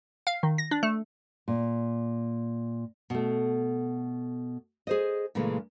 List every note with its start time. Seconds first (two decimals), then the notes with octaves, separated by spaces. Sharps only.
0.27 F5
0.43 D#3
0.58 A#6
0.71 D4
0.83 A3
1.48 A#2
3.10 B2 A3
4.87 G#4 C5 D#5
5.35 A#2 C#3 E3 G#3 A3